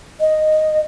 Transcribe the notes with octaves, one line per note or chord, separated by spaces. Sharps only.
D#5